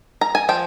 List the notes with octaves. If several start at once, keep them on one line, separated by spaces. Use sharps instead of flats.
A#5
G#5
F3 G5